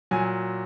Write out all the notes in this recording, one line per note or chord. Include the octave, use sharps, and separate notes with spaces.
A#2 F#3 G#5